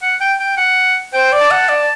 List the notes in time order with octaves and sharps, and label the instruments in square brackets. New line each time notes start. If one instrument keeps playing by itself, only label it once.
[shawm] F#5
G5
G5
F#5
[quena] C5 [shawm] G5
[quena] D5
[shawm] A5
[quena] F#5
D5